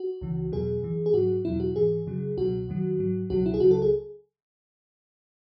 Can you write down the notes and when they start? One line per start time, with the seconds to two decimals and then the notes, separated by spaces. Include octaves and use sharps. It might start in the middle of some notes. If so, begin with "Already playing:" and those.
Already playing: F#4
0.21 C#2 C#3 E3
0.52 E2 B2 F#3 G#4
0.83 F#2 E3
1.06 G#4
1.14 G#2 F#3 F#4
1.45 E2 B2 F#3 E4
1.60 F#4
1.76 G#2 E3 G#4
2.07 F#2 C#3 F#3
2.37 C#2 B2 F#3 F#4
2.69 F#2 D#3 F#3
2.99 G#2 F#3
3.30 C#2 B2 F#3 F#4
3.46 E4
3.54 G#4
3.60 C#2 C#3 F#3 F#4
3.71 A4
3.82 G#4